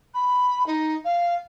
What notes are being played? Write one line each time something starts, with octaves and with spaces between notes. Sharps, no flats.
B5
D#4
F5